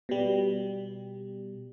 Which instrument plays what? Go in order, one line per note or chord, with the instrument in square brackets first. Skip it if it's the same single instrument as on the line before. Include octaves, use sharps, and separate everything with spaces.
[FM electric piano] B2 G3